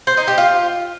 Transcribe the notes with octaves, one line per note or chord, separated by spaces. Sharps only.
C5
D#4
G4
F4